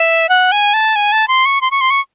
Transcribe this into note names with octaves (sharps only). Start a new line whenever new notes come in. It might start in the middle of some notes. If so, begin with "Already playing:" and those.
Already playing: E5
F#5
G#5
A5
G#5
A5
C6
C#6
C6
C#6
C6
C#6